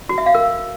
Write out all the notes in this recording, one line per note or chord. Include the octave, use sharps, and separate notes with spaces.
F#4
E5
F5
A#4